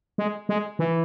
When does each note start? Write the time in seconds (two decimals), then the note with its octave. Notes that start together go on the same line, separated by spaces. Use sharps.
0.18 G#3
0.49 G#3
0.79 E3